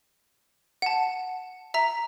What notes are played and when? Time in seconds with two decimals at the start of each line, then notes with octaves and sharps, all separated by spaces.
0.82 F#5 A5
1.74 E5 A#5